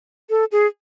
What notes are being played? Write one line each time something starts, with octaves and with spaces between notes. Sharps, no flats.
A4
G#4